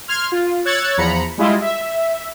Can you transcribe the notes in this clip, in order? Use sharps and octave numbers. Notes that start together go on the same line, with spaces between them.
C6 F6 G#6
F4
C#5 E6 F#6 G#6 A6 C#7
E2 F3 A#5 B5 C#7
G3 G#3 E4 F4 D#5
E5